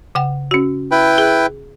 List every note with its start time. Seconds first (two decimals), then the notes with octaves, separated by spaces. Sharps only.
0.15 C#3 F#5 G5
0.51 C#4 F#4
0.91 E4 B4 G5
1.18 G#4